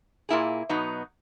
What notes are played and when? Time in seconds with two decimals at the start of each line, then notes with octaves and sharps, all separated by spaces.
0.29 A#2 A#3 E4 G#4
0.69 B2 F#3 B3 D#4